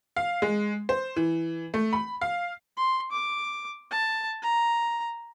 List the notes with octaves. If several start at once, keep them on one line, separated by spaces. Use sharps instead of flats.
F5
G#3
C5
E3
A3
B5
F5
C6
D6
A5
A#5